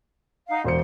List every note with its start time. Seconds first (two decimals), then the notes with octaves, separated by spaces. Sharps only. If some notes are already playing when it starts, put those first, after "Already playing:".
0.48 D#4 F5 F#5
0.64 E1 C5 C6 C#7